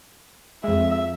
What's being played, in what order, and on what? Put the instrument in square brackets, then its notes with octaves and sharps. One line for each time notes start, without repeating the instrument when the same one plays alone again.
[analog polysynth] F2 G#3 [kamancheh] E5